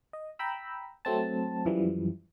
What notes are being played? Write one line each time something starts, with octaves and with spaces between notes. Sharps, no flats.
D#5
G5 A#5 B5 E6
F#3 A3 C4 A5
F#2 E3 F3 G3